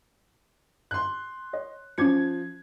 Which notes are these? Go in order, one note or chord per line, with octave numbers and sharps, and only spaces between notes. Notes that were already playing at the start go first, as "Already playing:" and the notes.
C6 F#6
C#5 D#5
F3 C#4 D6 G#6 C#7